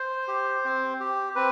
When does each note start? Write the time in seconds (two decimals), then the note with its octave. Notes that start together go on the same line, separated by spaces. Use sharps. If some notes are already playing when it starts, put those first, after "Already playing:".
Already playing: C5
0.28 G4
0.65 C4
1.00 G4
1.36 C4 B4